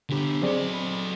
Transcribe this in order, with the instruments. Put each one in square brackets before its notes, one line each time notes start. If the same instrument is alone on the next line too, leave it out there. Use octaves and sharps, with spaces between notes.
[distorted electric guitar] D3 G4
[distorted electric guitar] F#3 D#5 [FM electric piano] C4 G#4 D5
[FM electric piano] B5